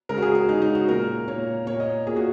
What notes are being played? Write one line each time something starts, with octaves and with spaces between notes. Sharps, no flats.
C#3 G#3 A#4
F#4
G#4
F#4
C#3 G#3 D#4
D#4
F#4
A#2 A#3 A#4
A#2 A#3 C#5
A#2 A#3 C#5
D#5
A#2 A#3 G#4
F#4